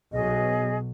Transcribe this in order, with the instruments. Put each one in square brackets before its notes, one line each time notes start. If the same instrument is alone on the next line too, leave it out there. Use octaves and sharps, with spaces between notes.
[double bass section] B1 B2 F#3 [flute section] G#4 D#5